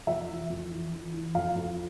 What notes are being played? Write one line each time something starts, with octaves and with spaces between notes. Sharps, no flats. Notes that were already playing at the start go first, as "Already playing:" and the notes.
F2 E5
E3
F2
E3
E3
E3
F2 F5
F2